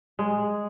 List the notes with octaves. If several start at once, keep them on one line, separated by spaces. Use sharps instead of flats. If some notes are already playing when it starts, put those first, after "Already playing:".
G#3